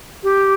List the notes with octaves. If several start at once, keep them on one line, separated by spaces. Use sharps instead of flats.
G4